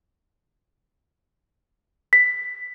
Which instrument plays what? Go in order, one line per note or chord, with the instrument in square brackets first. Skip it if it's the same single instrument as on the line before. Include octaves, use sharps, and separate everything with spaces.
[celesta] B6